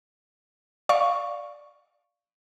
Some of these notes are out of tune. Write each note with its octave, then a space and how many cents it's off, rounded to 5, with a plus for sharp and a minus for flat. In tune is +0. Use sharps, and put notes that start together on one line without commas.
D5 +0 F5 +0 C#6 +0